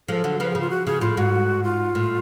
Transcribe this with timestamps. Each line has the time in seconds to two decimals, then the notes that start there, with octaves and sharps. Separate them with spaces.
0.08 F3 G#3 A4
0.24 D3 F#3
0.39 C#3 F3 B4
0.51 C#3 G#4
0.61 F4
0.70 F#4
0.86 C#3 G#4
1.01 A2 F4
1.17 G#2 F#4
1.64 F4
1.95 A2